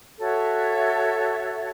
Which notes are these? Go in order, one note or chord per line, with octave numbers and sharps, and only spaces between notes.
F#4 A4 C#5 E5